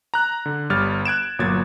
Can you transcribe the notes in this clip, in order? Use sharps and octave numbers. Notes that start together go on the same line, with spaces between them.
A#5 F#6
D3
G1 G3 F6 A6
F#6 G#6 D7 E7
G1 A#2 F#3 G#6 A6